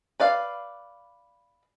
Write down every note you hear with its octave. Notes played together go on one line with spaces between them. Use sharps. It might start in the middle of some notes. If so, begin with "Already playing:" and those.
B4 D5 F5